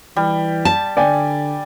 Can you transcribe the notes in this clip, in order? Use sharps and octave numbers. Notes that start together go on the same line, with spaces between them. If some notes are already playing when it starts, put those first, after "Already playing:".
E3 G3
A5
D3 D5 G5 G#5